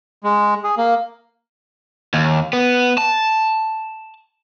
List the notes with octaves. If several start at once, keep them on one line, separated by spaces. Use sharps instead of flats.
G#3
G#4
A#3
D#2
B3
A5